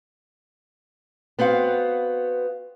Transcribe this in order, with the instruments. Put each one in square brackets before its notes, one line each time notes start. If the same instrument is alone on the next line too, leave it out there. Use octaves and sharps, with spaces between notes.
[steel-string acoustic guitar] B3 C4 F#4 F5